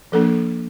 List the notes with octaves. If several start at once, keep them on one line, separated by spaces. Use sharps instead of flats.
F3 A#3 D4 A4